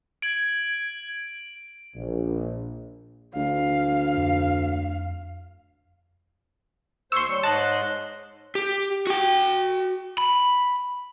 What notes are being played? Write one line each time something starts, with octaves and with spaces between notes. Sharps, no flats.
G#6 D7 F#7
A#1
D2 F5
F2
D#2 C5 C6 C#6 E6
G3 C#5
G#2 D#5 A5 C6 F#6
G4
F#4 G5
B5